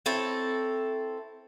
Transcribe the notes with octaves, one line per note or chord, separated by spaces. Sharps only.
C4 E4 A4 C#5